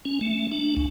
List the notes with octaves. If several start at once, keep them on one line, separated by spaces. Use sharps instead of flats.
C#4
A3
D4
C#2